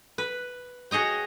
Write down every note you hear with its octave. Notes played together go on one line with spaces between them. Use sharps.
B4
F#4 G#4 C#5 D#5 G5